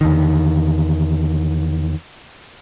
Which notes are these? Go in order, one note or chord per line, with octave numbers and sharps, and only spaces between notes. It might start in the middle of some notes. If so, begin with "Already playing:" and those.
E2 D3 D#3